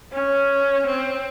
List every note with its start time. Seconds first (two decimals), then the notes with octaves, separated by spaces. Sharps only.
0.13 C#4
0.87 C4